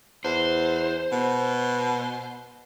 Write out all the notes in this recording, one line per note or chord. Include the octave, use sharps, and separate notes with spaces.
E2 C5
B2